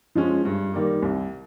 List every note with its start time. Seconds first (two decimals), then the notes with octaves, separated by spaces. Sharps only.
0.15 F3 G#3 C#4
0.45 G2
0.73 D#3 G3 A#3
1.02 C2